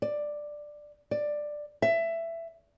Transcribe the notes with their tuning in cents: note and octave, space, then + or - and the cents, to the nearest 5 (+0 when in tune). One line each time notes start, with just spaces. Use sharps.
D5 +10
D5 +10
E5 +15